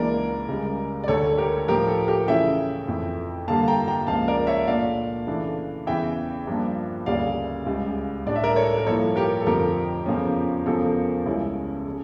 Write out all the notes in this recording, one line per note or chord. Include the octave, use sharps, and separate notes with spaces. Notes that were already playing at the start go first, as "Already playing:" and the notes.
Already playing: C#2 C#3 E3 A#3 D4 A#4 D5
C#2 C#3 G3
D5
D2 D3 A3 A4 C#5
G4 A#4
A2 F3 A3 D4 G4 A#4
A4
G4 A#4
C#3 E3 A3 C#4 E4 E5 G5
F2 E3 A3 E4
G2 D3 G3 A#3 F5 A5
G5 A#5
G5 A#5
C#2 C#3 F3 A#3 F5 A5
A#4 D5
C#5 E5
A#2 A3 D4 D5 F5
C#3 E3 A3 D4
E2 C#3 E3 E5 G5
G2 F3 A#3 D4
D2 C#3 G3 A#3 C#4 D5 F5
C#2 C#3 G3
A2 G3 D4 D5
E5
A#4 D5
A4 C#5
A#4
G2 F3 A#3 E4 A4 C#5
G4 A#4
A4
F2 D3 F3 A3 G4 A#4
E2 C#3 F3 A3 C#4
E2 C#3 F3 A4
C#2 C#3 G3 C#4 E4
C#3